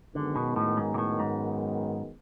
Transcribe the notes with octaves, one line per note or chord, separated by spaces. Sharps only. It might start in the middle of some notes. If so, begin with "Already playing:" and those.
F#2 D3 D#3 G#3 B3
B2
A2
G#2
A#2
A2
G#2